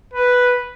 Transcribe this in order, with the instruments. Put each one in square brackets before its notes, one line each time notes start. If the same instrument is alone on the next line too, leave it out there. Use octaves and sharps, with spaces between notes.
[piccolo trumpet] B4